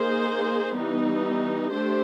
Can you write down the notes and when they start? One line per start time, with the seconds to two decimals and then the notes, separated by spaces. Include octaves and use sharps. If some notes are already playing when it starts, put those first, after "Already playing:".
Already playing: A#3 D#4 G#4 C5
0.76 E3 G3 B3 D#4
1.71 A3 D4 G4 C5